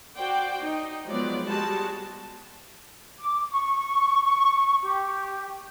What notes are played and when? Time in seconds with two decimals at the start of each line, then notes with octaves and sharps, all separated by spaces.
0.18 F#4 C5 D5 G5
0.62 D#4
1.07 F3 F#3 G#3 B3 D5
1.44 G3 G#3 F#4 A5
3.19 D6
3.51 C#6
4.82 G4